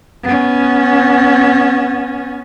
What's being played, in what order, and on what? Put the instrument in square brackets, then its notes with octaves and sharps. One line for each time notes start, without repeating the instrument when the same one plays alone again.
[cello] B3 C#4